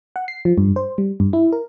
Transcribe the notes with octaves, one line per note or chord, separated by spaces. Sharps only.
F#5
C7
F3
G2
C5
G3
G2
E4
A#4